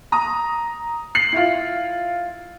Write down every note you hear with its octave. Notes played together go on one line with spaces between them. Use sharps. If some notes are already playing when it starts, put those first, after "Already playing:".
A#5 D#6
C7 F#7
E4 F4